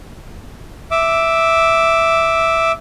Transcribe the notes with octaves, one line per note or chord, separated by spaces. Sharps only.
E5 D6